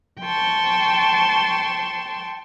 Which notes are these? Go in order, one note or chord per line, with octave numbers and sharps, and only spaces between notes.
G5 A5 C6 C#6